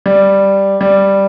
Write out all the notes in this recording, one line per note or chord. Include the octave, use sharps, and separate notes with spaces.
G3
G3